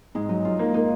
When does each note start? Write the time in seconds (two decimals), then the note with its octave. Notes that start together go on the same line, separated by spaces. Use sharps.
0.15 G#2 G#3
0.29 F#3 D#4
0.45 G#2 F4
0.59 A#3 D#4
0.74 A#3 D#4